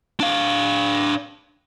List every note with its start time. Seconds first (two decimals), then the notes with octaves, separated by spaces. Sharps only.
0.20 D4 F5